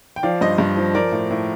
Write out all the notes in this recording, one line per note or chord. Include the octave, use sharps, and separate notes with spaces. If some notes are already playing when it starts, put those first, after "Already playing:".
G5
F3 D5 F5
G2 C5 D#5
G2
F3
F3 A#4 D5
A2
A2